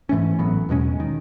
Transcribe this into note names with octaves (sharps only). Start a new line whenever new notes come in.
G#2 E3 A3 C#4
A1 A2 F#3 B3
E2 B2 G#3 C#4
D#3